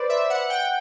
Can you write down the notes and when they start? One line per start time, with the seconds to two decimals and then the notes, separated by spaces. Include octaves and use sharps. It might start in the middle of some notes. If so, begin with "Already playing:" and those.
Already playing: B4 C5 D5
0.09 E5
0.30 F#5
0.50 G5